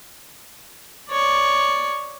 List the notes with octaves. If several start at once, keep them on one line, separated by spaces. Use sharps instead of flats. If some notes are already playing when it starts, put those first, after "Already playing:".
C#5 D5